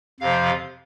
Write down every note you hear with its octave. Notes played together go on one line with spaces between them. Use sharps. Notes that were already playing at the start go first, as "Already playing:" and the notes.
F2 C3 F3 F5